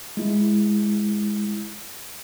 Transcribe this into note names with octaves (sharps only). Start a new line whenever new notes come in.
G#3 E4